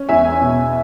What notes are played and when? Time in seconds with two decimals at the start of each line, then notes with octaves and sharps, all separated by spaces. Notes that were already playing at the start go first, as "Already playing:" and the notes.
Already playing: C#4
0.09 E2 E5 G#5
0.41 B2